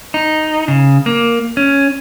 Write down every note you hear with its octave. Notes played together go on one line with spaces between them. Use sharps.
D#4
C#3
A#3
C#4